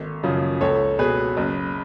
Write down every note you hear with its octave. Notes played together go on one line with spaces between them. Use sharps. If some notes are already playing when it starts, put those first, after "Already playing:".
Already playing: G#1 A4
F#2 C#3 F3
C#2 A4 C#5
B2 G#4 B4
F#1